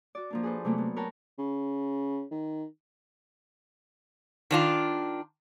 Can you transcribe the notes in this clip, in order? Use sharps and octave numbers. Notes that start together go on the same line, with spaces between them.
F#4 D5
F3 A#3 D4
G#4 A4 B4 C5
C3 F#3 A3 A#3 C4
A#3 B3
A#4 B4 C#5 G5 A5
C#3
D#3
D#3 D4 F4